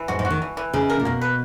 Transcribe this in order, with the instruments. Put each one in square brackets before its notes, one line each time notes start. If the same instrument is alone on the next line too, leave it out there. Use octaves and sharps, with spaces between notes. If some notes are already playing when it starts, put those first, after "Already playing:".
Already playing: [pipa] E3
[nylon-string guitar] G#2 [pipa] F#4
[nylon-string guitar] G#2
[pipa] F#4
[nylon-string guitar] D#3
[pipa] E3
E3
[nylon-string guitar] C#3 [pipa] D#4
[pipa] A#4
[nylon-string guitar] A#2
[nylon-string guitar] B2 [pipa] A#3
[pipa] B4